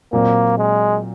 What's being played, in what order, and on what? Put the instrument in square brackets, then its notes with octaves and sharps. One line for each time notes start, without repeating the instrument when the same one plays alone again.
[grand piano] A#2 F#3 C4 [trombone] A#3
[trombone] G#3